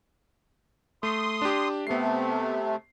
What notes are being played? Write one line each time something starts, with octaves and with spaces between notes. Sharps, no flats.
A3 C6 D#6
D4 G4
C3 A3 B3 C7